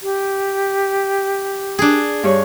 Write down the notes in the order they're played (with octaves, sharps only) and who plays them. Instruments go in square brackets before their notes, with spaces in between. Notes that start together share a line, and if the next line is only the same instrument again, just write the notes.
[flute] G4
[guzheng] D4 G#4
[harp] G2 C#5